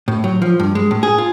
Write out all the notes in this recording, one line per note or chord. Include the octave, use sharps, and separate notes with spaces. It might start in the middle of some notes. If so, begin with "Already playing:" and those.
A2
F#3
F3
G2
G#3
A2
G#4
F4